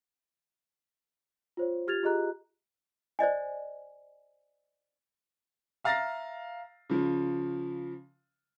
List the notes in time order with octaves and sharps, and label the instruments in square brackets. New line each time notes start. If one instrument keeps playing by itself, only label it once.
[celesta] F4 C5 C#5
F4 G4 F6 G#6 A6 F7
F4 G4 G#4 D#5 A#5 F#6
[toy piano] C5 D5 D#5 G#5
[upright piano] E5 F5 A#5 A6 A#6 C7
C#3 F3